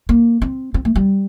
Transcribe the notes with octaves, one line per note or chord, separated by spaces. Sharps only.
A#3
C4
C4
A3
G3